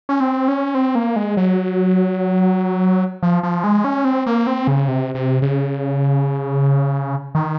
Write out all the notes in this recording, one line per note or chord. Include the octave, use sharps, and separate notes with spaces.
C#4
C4
C#4
C4
A#3
G#3
F#3
F3
F3
G#3
C#4
C4
A#3
C4
C#3
C3
C3
C#3
D#3